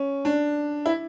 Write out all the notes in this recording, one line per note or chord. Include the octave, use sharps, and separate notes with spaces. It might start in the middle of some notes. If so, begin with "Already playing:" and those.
Already playing: C#4
D4
E4